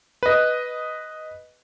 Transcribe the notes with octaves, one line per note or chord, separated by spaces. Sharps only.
B4 D#5